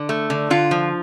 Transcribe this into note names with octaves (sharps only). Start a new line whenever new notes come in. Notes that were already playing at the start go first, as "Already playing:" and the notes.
Already playing: D3
A3
D3
D3 F4
F3